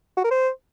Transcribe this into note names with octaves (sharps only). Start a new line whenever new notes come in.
F#4
A#4
C5